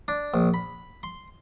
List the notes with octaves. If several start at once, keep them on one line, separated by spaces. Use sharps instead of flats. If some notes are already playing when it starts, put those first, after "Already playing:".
D4
A#1
B5
C6